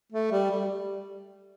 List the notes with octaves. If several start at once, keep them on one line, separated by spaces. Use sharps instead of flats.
A3
G3
G3